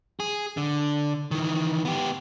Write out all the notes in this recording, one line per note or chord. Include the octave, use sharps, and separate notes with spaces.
G#4
D3
D#3 E3
B3 G4